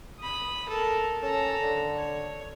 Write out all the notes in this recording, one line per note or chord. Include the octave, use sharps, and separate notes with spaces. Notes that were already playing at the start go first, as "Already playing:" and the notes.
B5 D#6
A4 A#4
C#4 A4 A#5
D3
C#5